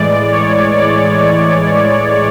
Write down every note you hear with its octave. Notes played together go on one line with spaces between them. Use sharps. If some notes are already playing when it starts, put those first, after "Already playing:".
Already playing: A2 E3 G#3 D5
C#5
D5